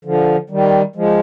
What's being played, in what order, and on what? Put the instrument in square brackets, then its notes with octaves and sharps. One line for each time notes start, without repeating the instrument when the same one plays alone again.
[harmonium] D3 F3
D#3 G3
F3 G#3